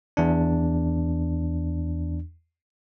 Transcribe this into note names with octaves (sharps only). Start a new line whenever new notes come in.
E2 D4